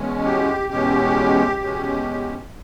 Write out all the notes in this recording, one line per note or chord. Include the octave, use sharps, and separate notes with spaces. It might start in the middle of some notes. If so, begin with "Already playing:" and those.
Already playing: E2 B2 G#3 C#4
G4
E2 B2 G#3 C#4 G4
E2 B2 G#3 C#4